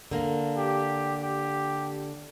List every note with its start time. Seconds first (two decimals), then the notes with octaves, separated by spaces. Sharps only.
0.11 D3 A#3
0.57 G4
1.22 G4